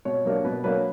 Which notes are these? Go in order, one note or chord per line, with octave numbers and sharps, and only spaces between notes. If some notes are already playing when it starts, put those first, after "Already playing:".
B2 C#5
F#3 A#3 D4
B2 B4
F#3 A#3 D4 B4